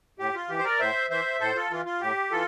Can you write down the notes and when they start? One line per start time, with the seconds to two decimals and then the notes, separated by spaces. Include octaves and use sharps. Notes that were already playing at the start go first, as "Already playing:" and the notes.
0.19 A2 G4
0.35 F4
0.49 E3 G4
0.58 C5
0.65 A#4 D5
0.80 A2 C5 E5
1.10 E3 C5 E5
1.40 A2 A4 C5
1.56 F4 A4
1.71 E3 F4
1.86 F4
2.01 A2 G4
2.31 E3 F4 A4